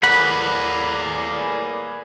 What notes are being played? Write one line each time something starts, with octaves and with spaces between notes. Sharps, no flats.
A2 G3 A#3 G#4 B4 F#5 B5